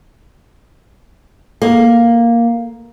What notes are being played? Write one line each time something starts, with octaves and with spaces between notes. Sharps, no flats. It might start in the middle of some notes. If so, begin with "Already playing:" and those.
A#3